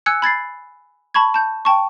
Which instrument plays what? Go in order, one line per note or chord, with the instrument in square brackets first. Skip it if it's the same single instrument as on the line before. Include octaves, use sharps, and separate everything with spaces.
[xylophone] G#5 E6 F#6 G#6 C#7
B5 G#6 A6 C7
A5 B5 C#6 G#6
A5 G6
G5 A5 C#6